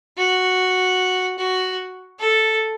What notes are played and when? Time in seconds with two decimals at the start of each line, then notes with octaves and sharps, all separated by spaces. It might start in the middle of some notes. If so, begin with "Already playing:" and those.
0.17 F#4
1.38 F#4
2.19 A4